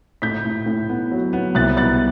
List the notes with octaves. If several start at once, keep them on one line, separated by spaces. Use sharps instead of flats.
A2 G6 B6
A2
A2
B3
F#3
B3
C2 F#6 A6
B3 F#6 A6